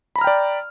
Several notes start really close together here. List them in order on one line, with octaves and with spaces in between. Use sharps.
B5 A#5 F6 G5 D5